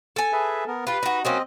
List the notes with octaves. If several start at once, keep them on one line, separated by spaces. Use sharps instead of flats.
A4 G#5
G#4 B4 E5
B3 A#4
F4 G4 B4
D#4 F#4
F#3 A#3 C4 C#4 D#5